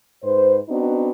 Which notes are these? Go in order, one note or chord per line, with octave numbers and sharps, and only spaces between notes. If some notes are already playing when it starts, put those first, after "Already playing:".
G#2 B4 C5
B3 C4 D4 D#4 F#4